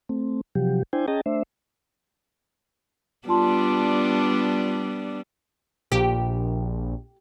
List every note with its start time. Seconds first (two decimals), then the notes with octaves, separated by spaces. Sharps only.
0.09 A3 C4
0.55 C3 F3 F#3 G4
0.93 D4 E4 C5 G5 G#5
1.08 C#4 G#4 D#5 G5 A5 A#5
1.26 A3 D4 C5 E5
3.28 G3 B3 D4 F4 A5 C6
5.92 A#1 G4